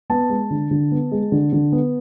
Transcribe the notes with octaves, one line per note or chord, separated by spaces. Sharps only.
B3 A5
G#3
D3
D3
B3
G#3
D3
D3
B3